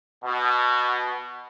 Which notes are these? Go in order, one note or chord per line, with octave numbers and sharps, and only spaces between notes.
B2